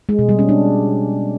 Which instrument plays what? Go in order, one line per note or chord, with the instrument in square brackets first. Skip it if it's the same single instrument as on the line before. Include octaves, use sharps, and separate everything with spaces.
[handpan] G#3
B2
G3
C#4
D4